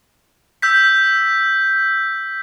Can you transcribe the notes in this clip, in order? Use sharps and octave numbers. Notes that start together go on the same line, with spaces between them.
E6 G6 B6